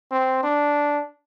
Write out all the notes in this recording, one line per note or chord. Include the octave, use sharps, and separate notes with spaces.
C4
D4